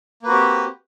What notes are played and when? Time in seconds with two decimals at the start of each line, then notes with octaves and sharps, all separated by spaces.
0.22 A#3
0.25 B4
0.27 F#4
0.30 C4
0.32 G4